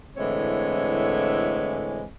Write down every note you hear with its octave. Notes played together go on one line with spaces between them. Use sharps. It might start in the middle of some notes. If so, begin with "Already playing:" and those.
A2 D3 E3 G#3 C4 C#5